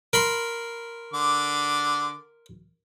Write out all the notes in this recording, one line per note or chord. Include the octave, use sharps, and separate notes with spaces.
A#4 B5 C6
D3 D6